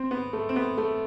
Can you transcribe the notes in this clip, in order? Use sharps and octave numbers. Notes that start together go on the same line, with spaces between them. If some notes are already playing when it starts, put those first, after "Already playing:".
Already playing: C4
B3
A3
C4
B3
A3